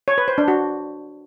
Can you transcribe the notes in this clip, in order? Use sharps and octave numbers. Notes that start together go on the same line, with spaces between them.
C#5
B4
C5
D4
F#4